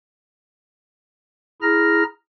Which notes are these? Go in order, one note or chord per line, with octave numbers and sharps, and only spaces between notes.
E4 G#4 A#5 F6 A#6